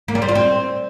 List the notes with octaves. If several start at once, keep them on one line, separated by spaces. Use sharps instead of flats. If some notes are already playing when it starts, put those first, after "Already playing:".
A#3
G3
C4
F4
C4